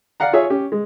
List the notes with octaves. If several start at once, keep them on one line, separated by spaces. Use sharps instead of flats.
D5 F5 F#5 A#5
F4 G#4 C#5 E5
C#4 G4
G#3